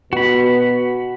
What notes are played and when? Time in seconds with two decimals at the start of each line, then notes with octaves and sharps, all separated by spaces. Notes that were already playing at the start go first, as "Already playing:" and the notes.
0.13 B2 F#4 B5